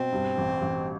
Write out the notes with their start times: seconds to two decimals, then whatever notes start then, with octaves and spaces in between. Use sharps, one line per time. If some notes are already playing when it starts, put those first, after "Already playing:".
Already playing: B2 C4
0.12 G2
0.37 A1
0.62 A1